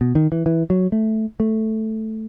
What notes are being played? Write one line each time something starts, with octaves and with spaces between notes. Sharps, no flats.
B2
D#3
E3
E3
F#3
A3
A3